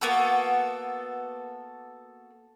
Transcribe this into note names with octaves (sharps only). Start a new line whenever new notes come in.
A#3 B3 F#4 A4